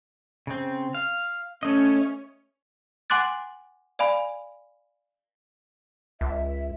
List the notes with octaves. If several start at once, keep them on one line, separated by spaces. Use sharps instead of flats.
C#3 C4
F5
A3 C#4 C#5 D#5
F#5 G#5 C6 D6 F#6 A6
D5 F5 G#5 B5
C#2 E5